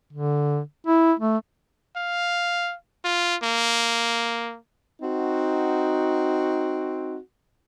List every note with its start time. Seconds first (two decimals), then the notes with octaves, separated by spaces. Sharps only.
0.13 D3
0.87 E4
1.19 A3
1.96 F5
3.05 F4
3.43 A#3
5.02 C4 D#4 F#4